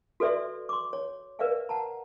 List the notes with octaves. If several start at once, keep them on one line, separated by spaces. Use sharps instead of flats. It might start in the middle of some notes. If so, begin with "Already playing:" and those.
F#4 A4 B4 D5 E5 C6
C6 D6
C#5
A#4 B4 D5 E5 F5 G#5
F#5 A5 A#5